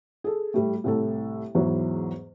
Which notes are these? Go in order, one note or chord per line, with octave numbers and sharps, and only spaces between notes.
G#4 A4
A2 G3 A3
C2 A2 A4
E2 G#2 E3 F#3